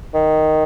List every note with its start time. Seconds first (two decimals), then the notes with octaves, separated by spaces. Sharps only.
0.14 D#3